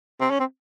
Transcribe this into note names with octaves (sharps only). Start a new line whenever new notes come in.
C4
C#4
C4